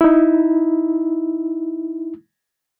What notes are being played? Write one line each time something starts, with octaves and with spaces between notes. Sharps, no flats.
D#4 E4